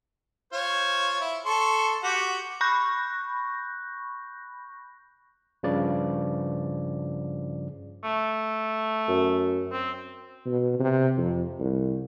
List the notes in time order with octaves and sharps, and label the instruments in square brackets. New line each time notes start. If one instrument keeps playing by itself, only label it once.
[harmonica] F4 C5 C#5
E4
A4 C6 C#6
F#4 G4
[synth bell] B5 C#6 F#6 G6 A#6
[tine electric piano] G2 C#3 F3 D5
[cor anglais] A3
[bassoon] F#2
[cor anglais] C4
[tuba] B2
C3
F2
C2